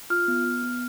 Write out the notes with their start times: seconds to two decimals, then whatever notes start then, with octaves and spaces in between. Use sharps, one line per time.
0.10 F4 F6
0.28 B3
0.45 B3
0.63 B3